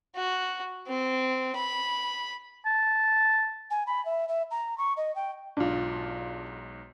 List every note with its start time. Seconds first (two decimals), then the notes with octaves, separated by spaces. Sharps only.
0.16 F#4
0.88 C4
1.56 B5
2.66 A5
3.71 G#5
3.87 B5
4.05 E5
4.28 E5
4.51 A#5
4.78 C#6
4.97 D#5
5.16 G5
5.57 B1 G#2 D4 F4